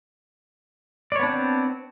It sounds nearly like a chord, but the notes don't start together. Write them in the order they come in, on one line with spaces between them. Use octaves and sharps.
D5 C#5 B3 D4 C4